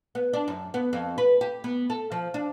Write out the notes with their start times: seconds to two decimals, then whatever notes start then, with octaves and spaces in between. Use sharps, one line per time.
0.15 B3
0.33 D4
0.48 F#2
0.74 B3
0.93 F2
1.18 B4
1.41 G4
1.64 B3
1.90 A4
2.12 F3
2.34 D4